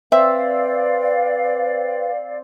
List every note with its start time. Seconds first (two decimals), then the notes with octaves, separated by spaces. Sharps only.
0.12 C4 B4 D5 E5 F5